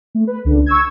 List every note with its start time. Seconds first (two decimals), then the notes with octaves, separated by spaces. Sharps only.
0.15 A3
0.27 B4
0.45 C#2 D3
0.66 C#6 E6 G#6